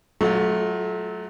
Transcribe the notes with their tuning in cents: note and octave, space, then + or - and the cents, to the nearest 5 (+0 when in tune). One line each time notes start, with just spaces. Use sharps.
F#3 +0 A3 -25 F4 +25